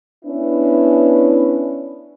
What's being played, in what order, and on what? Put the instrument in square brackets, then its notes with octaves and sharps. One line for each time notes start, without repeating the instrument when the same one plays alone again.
[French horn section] B3 C#4 D4 E4